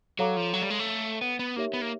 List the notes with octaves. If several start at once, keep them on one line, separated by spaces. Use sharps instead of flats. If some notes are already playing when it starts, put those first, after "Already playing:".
F#3 A4 C#5 F5 A#5 D6
F3
F#3
G3
G#3
A3
B3
B3
A#3 D#4 G4 A#4 C#5 E5
B3
A#3